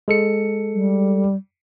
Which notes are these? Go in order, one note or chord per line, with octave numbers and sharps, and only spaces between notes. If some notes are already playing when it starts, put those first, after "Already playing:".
G#3 A4 C#7
G3